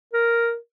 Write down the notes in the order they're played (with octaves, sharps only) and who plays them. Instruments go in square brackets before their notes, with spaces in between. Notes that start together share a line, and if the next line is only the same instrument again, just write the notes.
[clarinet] A#4